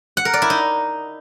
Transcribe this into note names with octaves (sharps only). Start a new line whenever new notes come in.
F#5
A#4
D5
E4
D#4